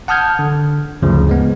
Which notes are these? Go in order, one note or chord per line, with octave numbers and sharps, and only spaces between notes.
F#5 A5 D#6 F6 G6 G#6
D3
D2 G2 C#3 F3
G#3 B3